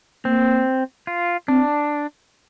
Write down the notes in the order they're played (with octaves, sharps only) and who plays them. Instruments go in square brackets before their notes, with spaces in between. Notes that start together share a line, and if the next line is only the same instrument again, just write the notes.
[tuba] A#3 [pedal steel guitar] C4
[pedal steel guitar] F4
[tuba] C4 [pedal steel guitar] D4